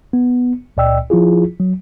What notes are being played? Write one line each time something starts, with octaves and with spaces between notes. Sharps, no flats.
B3
C#2 A#2 D5 D#5 G5 E6
F3 E4 F4 G#4
F#3